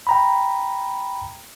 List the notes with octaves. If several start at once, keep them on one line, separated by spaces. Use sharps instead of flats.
G5 A#5 B5